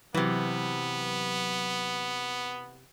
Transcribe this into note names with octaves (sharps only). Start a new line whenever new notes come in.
C3 E3 F#3 B3